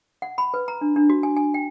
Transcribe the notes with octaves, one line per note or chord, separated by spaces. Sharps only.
F#5
B5
B4
A#5
D4
D4
F#4
G#5
G#5
G5